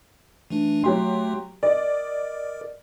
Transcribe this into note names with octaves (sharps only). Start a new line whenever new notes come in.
E3 A3 D4
F#3 A3 G4 C6
A#4 D5 D#5